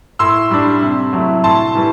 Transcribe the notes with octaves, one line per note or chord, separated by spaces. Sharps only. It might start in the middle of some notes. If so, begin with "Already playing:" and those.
A2 C6 E6
G3 D4
C3
F#3 A3 E4
A2 A5 C6
E3 G3